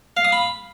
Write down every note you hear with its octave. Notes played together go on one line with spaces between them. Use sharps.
F5
D#6
B5